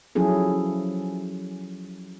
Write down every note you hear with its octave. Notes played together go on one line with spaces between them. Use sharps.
F3 F#3 C#4 E4 G#4 A4